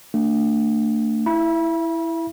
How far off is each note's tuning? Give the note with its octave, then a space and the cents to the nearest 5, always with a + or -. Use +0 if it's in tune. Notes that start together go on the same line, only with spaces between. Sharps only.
A3 +35 D4 +0
E4 +0 E5 +30 B5 -35